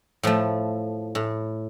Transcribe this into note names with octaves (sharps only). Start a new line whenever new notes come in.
A2 F3 A3
A2